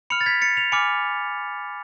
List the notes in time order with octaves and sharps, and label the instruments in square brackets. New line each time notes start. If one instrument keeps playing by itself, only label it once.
[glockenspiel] B5 F6 C#7 F7
A6
G#6 B6
A6 C#7
C#7 F7
G#5 B5 D6 F6 C#7 F7